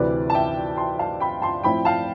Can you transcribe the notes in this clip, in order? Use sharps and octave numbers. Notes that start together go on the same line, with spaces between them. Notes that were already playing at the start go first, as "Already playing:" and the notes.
Already playing: D2 C3 E3 B4 D5
A5
E5 G5
A5 C6
F5 A5
G5 B5
A5 C6
A2 F3 C4 E4 G5 B5
F5 A5